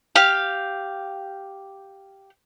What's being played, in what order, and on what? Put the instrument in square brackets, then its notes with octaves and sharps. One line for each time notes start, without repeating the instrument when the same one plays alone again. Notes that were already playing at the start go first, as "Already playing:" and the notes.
[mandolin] G4 F5